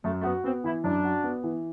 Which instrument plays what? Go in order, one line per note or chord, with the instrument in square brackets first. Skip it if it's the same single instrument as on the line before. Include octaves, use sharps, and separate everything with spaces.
[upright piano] F#2 [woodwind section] A3
[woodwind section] A3
[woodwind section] B3 [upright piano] F#4
[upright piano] B3 [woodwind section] C4
[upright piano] E3 [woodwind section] E4
[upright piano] F#2 [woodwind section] D4
[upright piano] F#4
B3
E3